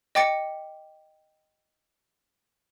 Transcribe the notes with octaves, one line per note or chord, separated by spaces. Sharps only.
D#5 G5 D6 A6 C#7